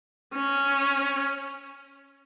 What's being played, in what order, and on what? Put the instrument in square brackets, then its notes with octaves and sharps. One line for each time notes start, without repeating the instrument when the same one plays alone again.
[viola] C#4